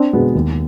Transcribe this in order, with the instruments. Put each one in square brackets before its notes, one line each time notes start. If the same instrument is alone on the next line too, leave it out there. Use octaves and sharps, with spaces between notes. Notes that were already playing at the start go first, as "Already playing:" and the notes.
Already playing: [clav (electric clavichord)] C4 D4
[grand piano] B2 G#3 B3
D#2